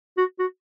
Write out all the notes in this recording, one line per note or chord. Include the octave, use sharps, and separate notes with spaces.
F#4
F#4